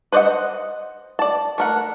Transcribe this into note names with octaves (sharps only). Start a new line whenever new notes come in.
B4 C5 D5 D#5 F#5
D5 A5
A3 A#4 F#5